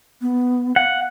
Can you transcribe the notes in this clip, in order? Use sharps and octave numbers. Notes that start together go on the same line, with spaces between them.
B3
F5 F#5